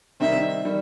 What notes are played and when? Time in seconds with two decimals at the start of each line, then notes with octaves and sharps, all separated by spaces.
0.20 C3 D#3 G3 C4 D#4 E5
0.65 D#3 G3